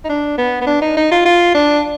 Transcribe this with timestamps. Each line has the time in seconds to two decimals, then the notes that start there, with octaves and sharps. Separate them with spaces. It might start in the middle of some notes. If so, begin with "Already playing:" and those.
0.04 D#4
0.09 D4
0.38 B3
0.61 B3
0.67 D4
0.82 D#4
0.97 D#4
1.11 F4
1.25 F4
1.54 D4